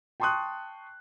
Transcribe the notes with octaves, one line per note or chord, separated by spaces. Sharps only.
G5 A5 C6 C#6 D#6 F#6